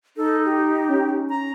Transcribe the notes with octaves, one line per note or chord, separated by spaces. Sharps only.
D#4 A4
G4
C#4
A#5